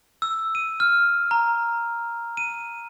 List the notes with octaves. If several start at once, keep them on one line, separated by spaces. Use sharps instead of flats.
E6
D#7
F6
A#5
D#7